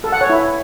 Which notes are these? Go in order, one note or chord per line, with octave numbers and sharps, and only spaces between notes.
A4
F#5
C#5
E4